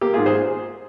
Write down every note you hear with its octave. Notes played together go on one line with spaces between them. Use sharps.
A#3 G4
F4 G#4
G#2
G#4 C5